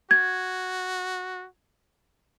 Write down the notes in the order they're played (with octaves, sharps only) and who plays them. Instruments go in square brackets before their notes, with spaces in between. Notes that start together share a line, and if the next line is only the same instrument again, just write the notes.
[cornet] F#4 [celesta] G#6